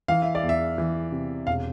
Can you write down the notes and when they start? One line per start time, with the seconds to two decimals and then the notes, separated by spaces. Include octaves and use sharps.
0.08 E3 F5
0.22 E5
0.35 D5
0.43 E2
0.49 E5
0.78 E3
1.12 C3
1.47 E1 F5